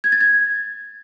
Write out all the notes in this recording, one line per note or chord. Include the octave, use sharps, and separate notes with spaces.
G#6
A6
G#6